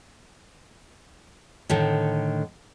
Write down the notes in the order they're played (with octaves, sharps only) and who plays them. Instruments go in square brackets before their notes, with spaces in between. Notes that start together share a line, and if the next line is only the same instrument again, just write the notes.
[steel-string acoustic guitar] A2 D3 D#3